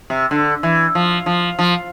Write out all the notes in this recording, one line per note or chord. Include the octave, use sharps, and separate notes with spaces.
C3
D3
E3
F3
F3
F3